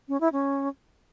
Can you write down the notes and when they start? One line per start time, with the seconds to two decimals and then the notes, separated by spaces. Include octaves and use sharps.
0.09 C#4
0.21 E4
0.33 C#4